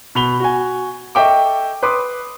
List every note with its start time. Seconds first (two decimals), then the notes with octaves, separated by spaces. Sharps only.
0.15 B2 B5 F7 G7
0.40 F#4 G#5
1.15 A4 D#5 E5 G5 C#6 D6
1.83 B4 C6 D6 D#6